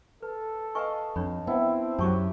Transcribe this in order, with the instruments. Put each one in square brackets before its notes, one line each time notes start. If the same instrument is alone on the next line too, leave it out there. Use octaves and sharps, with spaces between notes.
[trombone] A4 [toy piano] B4
[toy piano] B4 G#5 C#6 [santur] D#5 F5 A5
[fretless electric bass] F2 [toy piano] D4 C#5 B5
[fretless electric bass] B3 [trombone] C4 [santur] E4 [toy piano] F#5
[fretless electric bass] F#2 F#3 [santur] G4 [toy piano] A5 C#6 D6